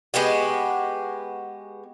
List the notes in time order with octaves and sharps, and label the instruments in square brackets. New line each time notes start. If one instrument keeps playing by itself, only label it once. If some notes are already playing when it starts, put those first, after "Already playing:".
[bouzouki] G#3 B3 F#4 G4